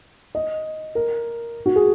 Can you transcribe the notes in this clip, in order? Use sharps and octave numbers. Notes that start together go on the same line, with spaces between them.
D#5
A#4
F#4
G#4